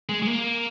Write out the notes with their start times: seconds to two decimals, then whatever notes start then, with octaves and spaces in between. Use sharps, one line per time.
0.09 G#3
0.22 G#3
0.27 A#3